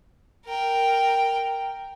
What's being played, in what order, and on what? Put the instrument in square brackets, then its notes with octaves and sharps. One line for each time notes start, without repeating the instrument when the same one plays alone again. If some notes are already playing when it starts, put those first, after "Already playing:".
[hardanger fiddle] A#4 G5